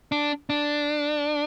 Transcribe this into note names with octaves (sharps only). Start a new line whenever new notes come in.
D4
D4